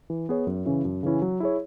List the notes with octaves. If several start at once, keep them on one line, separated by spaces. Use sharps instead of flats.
E3
B3 G#4 C#5
F#2
C#3 E3 C#4 E4
F#2
C#3 E3 C#4 E4
F#3
E4 G#4 C#5